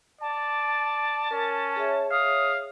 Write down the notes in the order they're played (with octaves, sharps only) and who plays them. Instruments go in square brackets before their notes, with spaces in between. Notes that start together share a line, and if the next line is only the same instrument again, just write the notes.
[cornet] D5 [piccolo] A5
[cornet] C#4 [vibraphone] A#4
[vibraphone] G#4 C#5 E5
[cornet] F5 [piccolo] D#6